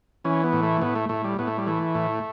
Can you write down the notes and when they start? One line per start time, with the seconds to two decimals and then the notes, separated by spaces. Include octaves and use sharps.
0.25 E3 C#4
0.44 B3
0.53 A2
0.63 A3
0.81 A2 B3
0.96 A3
1.09 A2 A3
1.24 G3
1.39 A2 B3
1.47 A3
1.58 G3
1.67 E3 A3
1.95 A2